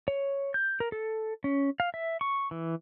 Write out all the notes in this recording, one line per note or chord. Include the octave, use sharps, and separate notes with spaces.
C#5
G6
A#4
A4
C#4
F5
E5
C#6
E3